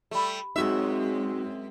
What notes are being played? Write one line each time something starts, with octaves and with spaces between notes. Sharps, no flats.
G3 A3 G4 B5
F#2 G#3 C4 D#4 F#4 G#4 E5